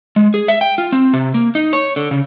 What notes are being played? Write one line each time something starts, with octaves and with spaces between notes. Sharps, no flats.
G#3
G#4
E5
G5
F4
C4
C3
A#3
D#4
C#5
D3
C#3